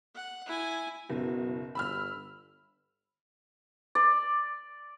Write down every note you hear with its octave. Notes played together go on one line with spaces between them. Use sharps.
F#5
E4 G#5
F#1 B2
G1 B5 E6 F6
D5